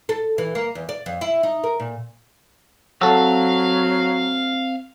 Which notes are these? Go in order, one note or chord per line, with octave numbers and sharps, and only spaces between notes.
A4
E3
A#3
E2
D5
F2
E4
D#4
A#4
A#2
F#3 C4 F#4 A4 F5 C#6 E6